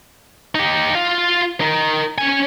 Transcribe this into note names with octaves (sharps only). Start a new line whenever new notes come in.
D#4 G4
F4 F5
D#4 A#4
C#4 G#5